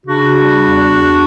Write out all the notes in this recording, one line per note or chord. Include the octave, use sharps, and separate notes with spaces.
C#3 D4 F#4
G3
E2
E2